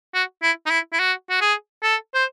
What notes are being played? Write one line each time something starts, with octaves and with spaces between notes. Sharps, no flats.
F#4
E4
D#4
E4
E4
F#4
F#4
G#4
A4
C5